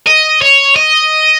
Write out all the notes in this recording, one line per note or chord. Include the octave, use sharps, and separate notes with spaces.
D#5
C#5
D#5